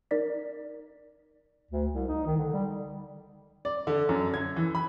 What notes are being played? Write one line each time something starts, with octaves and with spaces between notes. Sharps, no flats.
D#4 A#4 D5 B6
D2
C2
D#4
D#3
D3
G3
D5
D3
F#2
G#6
E3
B5